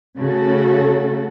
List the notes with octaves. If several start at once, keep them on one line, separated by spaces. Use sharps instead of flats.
C#3 A3 F#4 A4